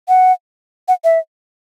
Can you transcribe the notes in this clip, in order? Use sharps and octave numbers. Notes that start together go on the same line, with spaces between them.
F#5
F#5
E5